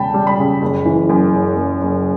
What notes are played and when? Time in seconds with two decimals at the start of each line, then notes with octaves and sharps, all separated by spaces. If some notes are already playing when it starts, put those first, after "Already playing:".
Already playing: E1 C#3 G3 G5 A5 B5
0.14 G3
0.27 B5
0.39 C#3
0.62 F#1
0.86 E3
1.09 F#2
1.33 F#1
1.56 F#1
1.81 F#1